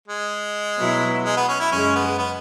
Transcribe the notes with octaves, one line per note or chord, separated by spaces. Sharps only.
G#3
B2 F#3 B3 E4
G#3
B3
C#4
E4
F#2 C#3 G#3 C#4
B3
B3